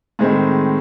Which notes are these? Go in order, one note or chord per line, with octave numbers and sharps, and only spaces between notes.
A2 D#3 G#3 C4